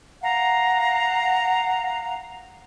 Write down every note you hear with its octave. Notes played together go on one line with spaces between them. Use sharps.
F5 F#5 A#5